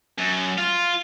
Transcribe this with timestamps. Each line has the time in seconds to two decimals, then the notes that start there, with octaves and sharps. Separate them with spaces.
0.19 F#2
0.58 F4